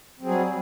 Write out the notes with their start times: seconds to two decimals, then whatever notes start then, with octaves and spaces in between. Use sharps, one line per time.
0.20 C4
0.22 F#3
0.25 G#4
0.28 G3